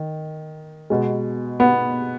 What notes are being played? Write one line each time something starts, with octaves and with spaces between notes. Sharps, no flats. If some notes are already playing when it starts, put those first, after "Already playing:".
Already playing: D#3
B2 G#3
B3